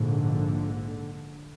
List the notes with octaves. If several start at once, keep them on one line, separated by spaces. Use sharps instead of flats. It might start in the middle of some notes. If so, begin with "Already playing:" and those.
Already playing: A#1 G#2 D3